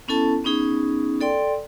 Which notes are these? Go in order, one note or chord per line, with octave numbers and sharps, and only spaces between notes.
B3 C#4 E4 A4 A5
B3 C#4 D#4 G#4
A4 D5 G5 C6